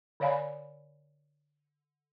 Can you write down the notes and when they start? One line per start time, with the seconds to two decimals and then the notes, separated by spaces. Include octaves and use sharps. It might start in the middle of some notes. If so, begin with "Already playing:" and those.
0.20 D3 C#5 D5 F5 G#5 B5